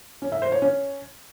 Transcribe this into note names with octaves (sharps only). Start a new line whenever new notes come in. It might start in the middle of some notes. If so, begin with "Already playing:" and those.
C#4
E5
C5
C#5
C#4